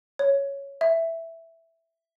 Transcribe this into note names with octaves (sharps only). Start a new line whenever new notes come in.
C#5
E5